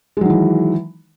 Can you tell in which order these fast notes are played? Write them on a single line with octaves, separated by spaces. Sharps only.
G#3 F#3 D#3 E3